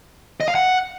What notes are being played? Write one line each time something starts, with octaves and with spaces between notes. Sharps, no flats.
D#5
F5
F#5